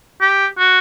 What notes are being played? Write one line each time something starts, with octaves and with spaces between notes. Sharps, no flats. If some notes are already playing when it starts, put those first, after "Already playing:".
G4
F#4